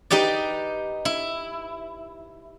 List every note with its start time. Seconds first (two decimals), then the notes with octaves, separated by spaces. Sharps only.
0.11 D#4 G4 B4 D5
1.05 E4